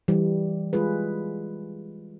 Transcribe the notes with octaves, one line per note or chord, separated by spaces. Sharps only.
E3 G3
G#3 F4 G#4 B4